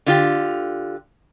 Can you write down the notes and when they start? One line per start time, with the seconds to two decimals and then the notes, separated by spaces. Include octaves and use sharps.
0.06 D3 F4 G4